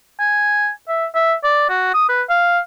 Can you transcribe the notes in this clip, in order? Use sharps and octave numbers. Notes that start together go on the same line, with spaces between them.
G#5
E5
E5
D5
F#4
D#6
B4
F5